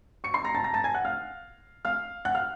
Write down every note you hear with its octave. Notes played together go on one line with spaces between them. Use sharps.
C#6 C#7
C6 C7
A#5 A#6
A5 A6
A#5 A#6
A5 A6
G#5 G#6
F#5 F#6
F5 F6
F5 F6
F#5 F#6
F5 F6